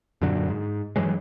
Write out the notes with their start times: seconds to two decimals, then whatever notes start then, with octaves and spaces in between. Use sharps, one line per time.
0.22 F#2 A#2 D3 F#3
0.49 G#2
0.96 G2 E3 F#3 G#3